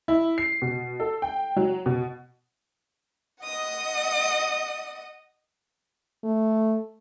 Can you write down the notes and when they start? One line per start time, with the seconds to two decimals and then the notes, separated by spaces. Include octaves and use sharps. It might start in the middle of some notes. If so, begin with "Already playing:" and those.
0.08 E4
0.38 C7
0.62 B2
1.00 A4
1.22 G5
1.56 F#3
1.86 B2
3.44 D#5 F#5 D#6
6.24 A3